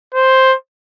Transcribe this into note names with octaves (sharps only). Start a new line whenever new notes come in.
C5